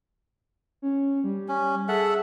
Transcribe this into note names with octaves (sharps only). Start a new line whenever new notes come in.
C#4
G3
C#4
G#4 A4 E5 F#5